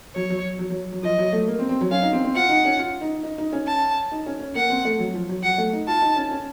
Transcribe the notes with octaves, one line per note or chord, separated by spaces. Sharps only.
F#3 C#5
F#3
F#3
F#3
F#3
F3 D#5
F#3
A3
A#3
C4
C4
F#3
C#4 F5
D#4
C4
C4
F4 F#5
D#4
C#4
F4
D#4
D#4
D#4
C#4
A5
D#4
C#4
C#4
A#3 F#5
C4
A3
F#3
F3
F#3
F#3 F#5
A3
D#4
F4 A5
D#4
C#4
C#4